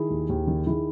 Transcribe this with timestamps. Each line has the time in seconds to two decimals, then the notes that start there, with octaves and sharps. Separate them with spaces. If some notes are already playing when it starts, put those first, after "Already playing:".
Already playing: D#3 E4 G#4
0.10 D#2
0.29 D#2
0.47 D#3
0.66 D#3 E4 G#4